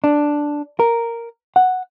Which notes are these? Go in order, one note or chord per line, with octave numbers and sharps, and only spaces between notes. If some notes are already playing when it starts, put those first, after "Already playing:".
D4
A#4
F#5